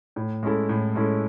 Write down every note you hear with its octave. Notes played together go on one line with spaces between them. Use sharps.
A2
G#3 C#4 E4 A4
A2
G#3 C#4 E4 A4